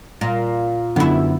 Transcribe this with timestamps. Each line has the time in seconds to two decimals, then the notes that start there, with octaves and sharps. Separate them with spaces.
0.21 A#2
0.96 F#2 D3 B3 E4